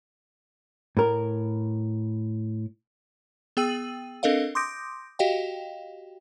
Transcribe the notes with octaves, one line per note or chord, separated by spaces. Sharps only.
A2 A#4
B3 G#4 G5 E6 D#7 F#7
C4 D4 A4 A#4 D#5 F5
C6 D6 D#6 G6 A#6 D7
F#4 G4 D#5 F5 G5